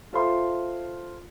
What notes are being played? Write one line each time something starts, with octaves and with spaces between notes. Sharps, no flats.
F4 A4 C5 E5 F5 C6